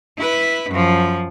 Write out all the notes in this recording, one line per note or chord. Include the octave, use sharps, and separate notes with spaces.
E4 B4
F#2 F3